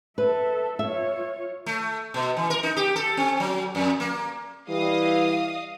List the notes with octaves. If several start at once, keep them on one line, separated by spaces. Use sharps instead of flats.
A4 B4 E5
F4 C#5 E5
A3
B2
E3
A#4
D#4
G4
A4
C4
F#3
F2
A#3
E3 G3 D#5 F5 D#6